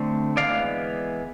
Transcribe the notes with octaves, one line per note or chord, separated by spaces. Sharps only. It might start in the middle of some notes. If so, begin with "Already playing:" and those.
Already playing: D3 A3 C4
E3 G#3 B3 D5 F5